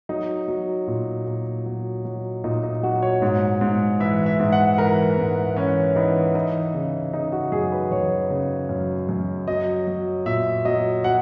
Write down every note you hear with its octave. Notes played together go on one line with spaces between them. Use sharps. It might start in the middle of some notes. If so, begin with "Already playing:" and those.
F#3 D#4
F#3
A#2
A#2
F#3
F#3
A#2 D#4
D#4
F#3 F#4
C#5
G#2
G#2
E3 E5
E5
G#2
F#5
E3 A#4
G#2
E3 C#4
E3 D#4
E3 D#4
C#3
C#3 D#4
F#4
F#2 G#4
B4
F#2 C#5
C#3
F#2
F#2
F#3 D#5
F#3
A#2 E5
F#3 D#5
F#3 F#5